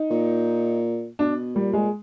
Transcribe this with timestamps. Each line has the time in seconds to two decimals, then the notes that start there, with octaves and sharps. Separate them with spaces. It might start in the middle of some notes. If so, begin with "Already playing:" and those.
Already playing: D#4
0.11 A#2
1.19 B2 D4
1.55 A#2 G3
1.73 G#3